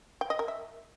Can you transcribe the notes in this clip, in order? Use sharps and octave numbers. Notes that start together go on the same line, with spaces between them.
G5
D#5
A#4
E5